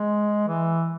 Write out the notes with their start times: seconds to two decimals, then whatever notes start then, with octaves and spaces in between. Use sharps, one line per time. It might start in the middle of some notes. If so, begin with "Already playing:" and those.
Already playing: G#3
0.48 E3